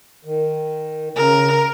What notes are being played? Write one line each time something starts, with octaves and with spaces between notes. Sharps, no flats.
D#3
C#3 A#4